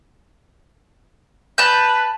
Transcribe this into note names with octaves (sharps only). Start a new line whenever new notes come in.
B4 A5 G6